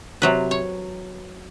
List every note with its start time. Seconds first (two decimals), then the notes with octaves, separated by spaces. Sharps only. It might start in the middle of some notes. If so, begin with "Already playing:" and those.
0.22 C3 F#3 B4
0.51 C#5